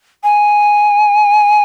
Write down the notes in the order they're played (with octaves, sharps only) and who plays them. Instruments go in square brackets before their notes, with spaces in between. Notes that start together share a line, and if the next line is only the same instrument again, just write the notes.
[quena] G#5